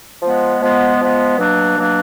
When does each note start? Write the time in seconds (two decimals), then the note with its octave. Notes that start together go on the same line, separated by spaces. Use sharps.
0.21 F3 G#3 B3
0.61 F3 G#3 B3
0.99 F3 G#3 B3
1.38 B2 F#3 A#3 D4
1.77 B2 F#3 A#3 D4